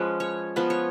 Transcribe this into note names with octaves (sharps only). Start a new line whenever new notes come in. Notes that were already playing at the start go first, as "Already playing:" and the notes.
Already playing: F3 G#3 C#4 B4
C#5
F3 B3 B4
C#5